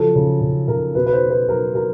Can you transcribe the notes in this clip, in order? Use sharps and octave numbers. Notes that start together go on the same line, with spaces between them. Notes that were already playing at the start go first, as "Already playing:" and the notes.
Already playing: C#3 F3 F#3 A4
C#3
C#3
C#3 A#4
B2 B4
B4
C5
B2
B4
F#3 A#4
F#3 A#4